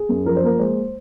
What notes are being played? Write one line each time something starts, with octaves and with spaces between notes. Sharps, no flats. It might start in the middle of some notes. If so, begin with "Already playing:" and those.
Already playing: G#4
F#2
F3 A#4
C5
A#3 A#4
G#3 C5